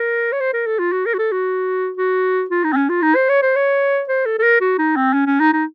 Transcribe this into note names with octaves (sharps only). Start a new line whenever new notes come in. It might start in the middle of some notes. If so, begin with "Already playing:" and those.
Already playing: A#4
C#5
C5
A#4
A4
F4
F#4
A#4
F#4
A4
F#4
F#4
F4
D#4
C4
C#4
F4
D#4
C5
C#5
C5
C#5
C5
A4
A4
A#4
F#4
D#4
C4
C#4
C#4
D#4
D#4